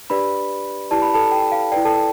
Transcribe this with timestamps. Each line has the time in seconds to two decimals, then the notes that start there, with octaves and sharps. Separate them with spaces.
0.10 D4 G4 B4 D5 B5
0.91 E4 G4 B4 D5 A5
1.02 B5
1.14 A4 A5
1.32 G5
1.52 F5
1.72 E4 B4 D5 G5
1.85 A4 A5